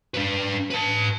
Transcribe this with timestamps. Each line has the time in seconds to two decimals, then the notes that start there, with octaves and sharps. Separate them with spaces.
0.14 D4 B4
0.70 B4 A5